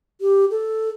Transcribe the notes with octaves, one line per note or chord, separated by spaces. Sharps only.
G4
A4